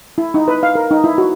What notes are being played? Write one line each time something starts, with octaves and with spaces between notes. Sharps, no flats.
E4
D#4
B4
F5
A#4
D#4
E4
F#4